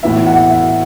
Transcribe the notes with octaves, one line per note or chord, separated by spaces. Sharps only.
A2 E3 B3 E5
F#5
E5